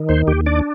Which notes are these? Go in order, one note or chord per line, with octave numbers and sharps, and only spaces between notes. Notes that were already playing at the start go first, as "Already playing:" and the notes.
Already playing: D#3
D#2 C5
D#2 G4
D4 D5